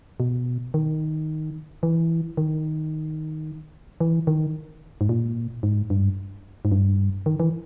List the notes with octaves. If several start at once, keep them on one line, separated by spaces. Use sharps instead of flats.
B2
D#3
E3
D#3
E3
D#3
G#2
A#2
G#2
G2
G#2
G2
D#3
E3